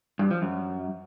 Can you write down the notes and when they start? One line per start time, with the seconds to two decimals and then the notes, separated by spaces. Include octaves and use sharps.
0.19 G2
0.31 F3
0.42 F#2